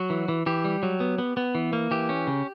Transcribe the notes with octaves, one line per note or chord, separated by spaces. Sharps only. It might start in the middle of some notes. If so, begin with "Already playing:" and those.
Already playing: F#3 F#4
E3
E3
E3 G4
G3
F#3
B3
B3
B3
E3
A#3
E3 G4
C#4
C#3